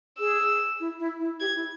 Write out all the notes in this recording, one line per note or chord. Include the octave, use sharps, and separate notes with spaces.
G#4 E6
E4
E4
E4
G4 G#6
E4